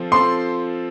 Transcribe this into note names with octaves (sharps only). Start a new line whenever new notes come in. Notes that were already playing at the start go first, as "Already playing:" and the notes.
Already playing: F3 C4 F4 A4
F3 C4 F4 A4 C6